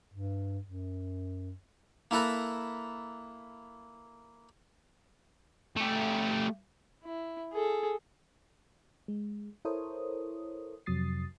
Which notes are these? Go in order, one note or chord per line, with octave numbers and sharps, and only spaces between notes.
G2
F#2
A#3 E4 A4 B4 A#5
A3 G4
E4
G#4 A4
G#3
E4 A4 A#4 C5 C#5 D#6
F2 C3 F#3 D#6 A6 C7